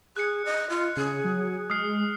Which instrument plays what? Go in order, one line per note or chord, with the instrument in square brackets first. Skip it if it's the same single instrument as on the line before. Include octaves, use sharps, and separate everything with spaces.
[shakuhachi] G#4 [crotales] F#6 C#7
[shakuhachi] D#5
F4
[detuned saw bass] C#3 [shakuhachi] G#4
[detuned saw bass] F#3
[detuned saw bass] G#3 [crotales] D#6 F6 C7